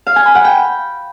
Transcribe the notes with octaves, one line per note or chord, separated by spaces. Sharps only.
F5
G#5
B5
F#5
G5